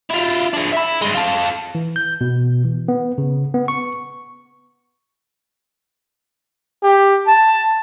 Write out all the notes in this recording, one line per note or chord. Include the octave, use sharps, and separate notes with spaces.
E4 F4
D4 G#4
E5 B5
G2 G#3
F4 A4
E3
G6
B2
E3
B3
C#3
B3
C#6
G4
A5